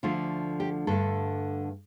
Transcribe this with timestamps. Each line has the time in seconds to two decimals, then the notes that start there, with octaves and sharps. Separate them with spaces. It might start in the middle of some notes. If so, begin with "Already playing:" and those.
0.03 D2 D3 F3 A3 F4
0.60 G4
0.87 G2 D3 A3 A4